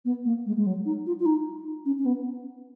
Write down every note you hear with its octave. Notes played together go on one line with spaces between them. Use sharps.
B3
A#3
G#3
G#3
F#3
D#4
F4
F4
D#4
C#4
C#4
B3